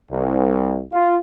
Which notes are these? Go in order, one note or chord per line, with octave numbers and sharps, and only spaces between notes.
C2
F4